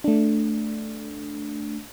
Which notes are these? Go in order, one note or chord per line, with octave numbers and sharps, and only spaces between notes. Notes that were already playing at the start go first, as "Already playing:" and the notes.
A3 D4